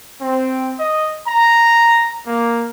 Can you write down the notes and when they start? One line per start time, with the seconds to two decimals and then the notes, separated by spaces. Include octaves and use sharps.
0.21 C4
0.80 D#5
1.27 A#5
2.27 A#3